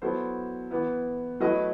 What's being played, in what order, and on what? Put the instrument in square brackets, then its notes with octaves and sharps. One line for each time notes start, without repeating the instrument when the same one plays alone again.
[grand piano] F#3 B3 E4 A4 C5
E3 B3 E4
F#3 A3 E4 B4 D#5